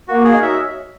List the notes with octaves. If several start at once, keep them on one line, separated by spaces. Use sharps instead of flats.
A#3 F#4
G#4
D#4 F#4 A#4 C#5
E5